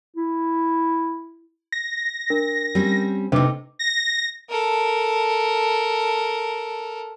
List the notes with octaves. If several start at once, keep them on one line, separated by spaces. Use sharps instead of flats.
E4
A#6
D4 A#4
G3 C4 C#4
C3 A3 D4 D#4 B4 D6
A#6
A4 A#4